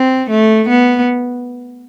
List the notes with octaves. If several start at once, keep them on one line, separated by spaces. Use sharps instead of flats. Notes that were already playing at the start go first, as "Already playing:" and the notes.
Already playing: C4
A3
B3